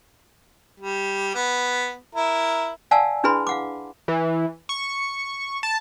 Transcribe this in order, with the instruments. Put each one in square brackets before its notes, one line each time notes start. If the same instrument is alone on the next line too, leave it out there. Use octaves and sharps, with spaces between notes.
[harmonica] G3
B3
E4 A#4
[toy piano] D5 F5 F#5 G#5 A5 E6
D4 E4 G#4 B4 B5 C6
F5 F#5 D6
[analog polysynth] E3
C#6
A5